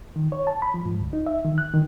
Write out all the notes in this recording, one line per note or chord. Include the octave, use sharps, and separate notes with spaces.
D#3
C#5
A5
B5
F3
G#2
D2
D#4
E5
D#3
F#6
D#3